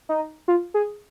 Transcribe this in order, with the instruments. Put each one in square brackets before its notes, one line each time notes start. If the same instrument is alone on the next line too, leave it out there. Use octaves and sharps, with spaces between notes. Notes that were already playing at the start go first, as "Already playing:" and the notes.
[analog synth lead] D#4
F4
G#4